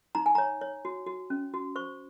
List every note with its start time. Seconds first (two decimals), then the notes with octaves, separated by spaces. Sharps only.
0.15 D#4 A#5
0.26 G#5
0.35 C#5 A#5
0.61 C#5
0.85 F#4
1.07 F#4
1.30 C#4
1.54 F#4
1.76 C5 C#6